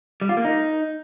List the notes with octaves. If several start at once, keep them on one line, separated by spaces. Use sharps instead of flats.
G3
F4
A#3
D#4